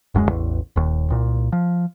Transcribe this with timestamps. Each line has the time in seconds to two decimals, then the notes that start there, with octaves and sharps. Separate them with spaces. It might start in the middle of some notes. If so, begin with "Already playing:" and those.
0.14 D#1 F#2 F3 G#3
0.28 A1 E2
0.76 D#1 D#2
1.10 C2 A#2
1.52 F3